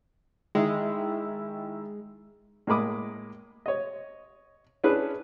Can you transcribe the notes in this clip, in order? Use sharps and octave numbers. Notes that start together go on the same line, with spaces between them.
D#3 G#3 E4
A2 G#3 A#3 B5 D6 D#6
C#5 D#5
C#4 D4 E4 G#4 B4